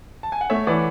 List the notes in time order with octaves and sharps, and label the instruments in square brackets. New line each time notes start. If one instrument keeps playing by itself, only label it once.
[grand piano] A5
G#5
F#5
[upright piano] A3 [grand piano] C#5 E5
[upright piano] E3 [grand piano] D5 F#5